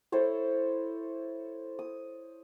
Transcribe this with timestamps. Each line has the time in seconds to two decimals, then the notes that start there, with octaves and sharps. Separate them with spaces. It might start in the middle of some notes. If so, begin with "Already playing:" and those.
0.12 E4 A4 C5 C#5
1.79 D#6